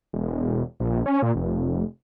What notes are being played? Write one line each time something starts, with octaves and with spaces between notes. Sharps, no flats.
E1
A#1
C#4
A#2
F1